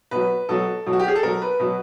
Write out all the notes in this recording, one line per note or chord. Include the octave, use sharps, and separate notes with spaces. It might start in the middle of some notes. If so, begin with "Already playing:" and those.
B2 F#3 B4
B2 F#3 A4
B2 F#3
F#4
G4
G#4
A4
B2 F#3 A#4
B4
B2 F#3